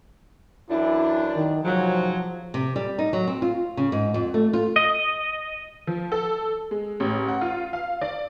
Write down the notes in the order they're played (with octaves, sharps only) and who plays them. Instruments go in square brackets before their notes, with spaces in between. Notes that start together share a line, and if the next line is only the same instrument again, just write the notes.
[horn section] F#2 E3 D4 [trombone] E4
[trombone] D#3
[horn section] G#2 C3 F#3 [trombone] F3
[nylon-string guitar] C3
G3
D#4
F#3
C4
F4
C#3
G#2
F2
A3
F4
[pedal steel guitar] D#5
[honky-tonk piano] F3
A4
G#3
A1
F#5
F4
F5
D5